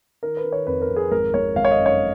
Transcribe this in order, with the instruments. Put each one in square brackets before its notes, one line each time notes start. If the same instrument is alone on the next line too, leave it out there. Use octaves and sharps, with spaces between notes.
[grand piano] D#3 A#4
B4
D#3
C#5
F2 B4
A#4
F2
G#4
G#1 A#4
G#1 C#5
G#1 F5
C#5
D#5
F#2
C#5